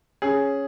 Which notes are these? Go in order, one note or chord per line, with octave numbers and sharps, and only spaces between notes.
C#4 G#4